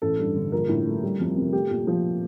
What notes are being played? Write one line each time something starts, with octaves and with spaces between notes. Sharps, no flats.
A1 A4
G2
D3
A#1 A#4
A2
A3
G3
F2
C3
A3 G4
A#2
F3